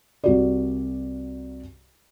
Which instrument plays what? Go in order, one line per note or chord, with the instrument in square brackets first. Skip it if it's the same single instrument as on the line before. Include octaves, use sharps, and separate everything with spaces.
[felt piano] C2 F#4 D5